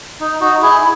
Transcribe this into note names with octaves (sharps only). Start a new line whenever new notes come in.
D#4
D#4 F#4
E4 G#4